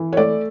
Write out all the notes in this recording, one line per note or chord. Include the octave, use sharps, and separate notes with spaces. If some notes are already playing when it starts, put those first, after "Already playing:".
Already playing: E3
C#5
A3 D5